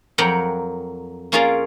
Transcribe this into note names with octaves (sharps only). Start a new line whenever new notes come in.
F2 F#3 A#4 F#5 G5
A#3 C#4 F4 G#4 A#4 D5